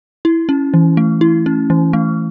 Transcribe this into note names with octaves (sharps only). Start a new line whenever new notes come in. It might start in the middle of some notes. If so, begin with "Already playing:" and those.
E4
C#4
E3
A3
E4
C#4
E3
A3